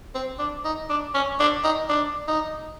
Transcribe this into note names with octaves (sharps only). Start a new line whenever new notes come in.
C4
D4
D#4
D4
C#4
D4
D#4
D4
D#4